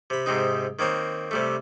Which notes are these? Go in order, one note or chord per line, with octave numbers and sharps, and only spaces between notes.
C3 B5
G#2 C3 C4 D#4
D#3 A#3 C4 C#5
C3 G3 A3